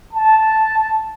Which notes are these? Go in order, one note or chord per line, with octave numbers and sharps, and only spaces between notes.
A5